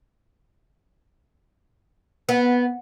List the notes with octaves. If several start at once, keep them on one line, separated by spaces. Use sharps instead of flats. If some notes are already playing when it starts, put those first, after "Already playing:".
B3